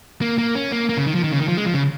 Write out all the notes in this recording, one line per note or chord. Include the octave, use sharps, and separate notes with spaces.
A#3
A#3
C#4
A#3
A#3
C#3
D#3
F3
D#3
C#3
D#3
F3
G#3
F3
C#3